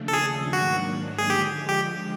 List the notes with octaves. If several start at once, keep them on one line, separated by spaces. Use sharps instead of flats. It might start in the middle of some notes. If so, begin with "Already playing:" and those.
Already playing: D#2 C#3 F3 A3 D4
A4
G#4
G#2 D#3 F#3 A#3 D4 F#4
G#4
D3 F3 G#3 G4
G4